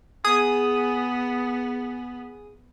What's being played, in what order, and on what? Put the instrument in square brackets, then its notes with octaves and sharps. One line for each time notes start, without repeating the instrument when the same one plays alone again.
[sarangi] B3 [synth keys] G#4 D#6